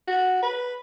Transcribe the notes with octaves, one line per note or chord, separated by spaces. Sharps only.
F#4
B4